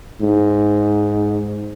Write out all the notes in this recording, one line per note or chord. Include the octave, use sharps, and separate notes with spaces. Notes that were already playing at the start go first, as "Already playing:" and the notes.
G#2